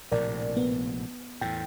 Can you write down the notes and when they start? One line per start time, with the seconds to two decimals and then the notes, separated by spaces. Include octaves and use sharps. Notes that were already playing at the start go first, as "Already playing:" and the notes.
0.12 A#1 A2 C3 A#4 D5
0.57 B3
1.41 E2 A2 G5